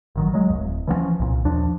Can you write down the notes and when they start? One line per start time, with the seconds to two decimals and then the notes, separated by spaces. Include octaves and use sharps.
0.16 A1 D#3 F#3
0.34 F#3 G#3
0.50 D1 D#2
0.87 E3 F3 A#3 C#4
1.19 C2 A#2
1.45 D#2 F3 D4